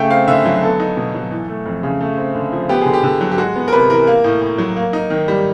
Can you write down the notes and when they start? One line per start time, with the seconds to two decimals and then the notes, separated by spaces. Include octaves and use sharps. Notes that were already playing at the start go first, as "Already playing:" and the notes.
Already playing: C#3 A3 G5
0.10 C4 F5
0.28 D3 E5
0.45 F#3
0.63 B3 A4
0.80 D#4
0.97 B2
1.14 F#3
1.32 E3
1.48 A3
1.66 F2
1.83 C#3
2.01 A3
2.17 C4
2.35 D3
2.52 F3
2.69 B3 G4
2.82 D3 G#4
2.93 G4
3.03 D3
3.21 F#3
3.31 G4
3.38 G#3 F#4
3.56 B3
3.68 A#4
3.73 C3 B4
3.90 E3 A#4
4.07 A#3
4.24 A2
4.42 A2
4.58 F#3
4.77 A#3
4.93 D#4
5.10 D#3
5.28 G3